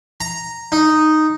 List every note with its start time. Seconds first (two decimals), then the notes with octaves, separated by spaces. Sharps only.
0.21 A#5
0.72 D#4